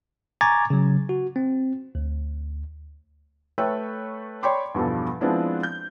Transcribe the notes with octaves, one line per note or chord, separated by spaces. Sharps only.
G#5 A#5 C#6 D6 G#6 A6
C#3 F#3
F#4
C4
D2
A3 A4 B4 C#5 E5 G5
C#5 D5 G5 B5 C6 D6
E2 G2 B2 F3 A4
F3 G#3 B3 C4 D4 E4
G6